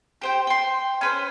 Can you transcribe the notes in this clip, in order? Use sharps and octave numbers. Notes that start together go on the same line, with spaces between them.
G4 C5 G5
G5 C6
C#4 B4 C5